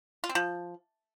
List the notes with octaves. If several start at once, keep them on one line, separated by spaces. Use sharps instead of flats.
F4
C4
F3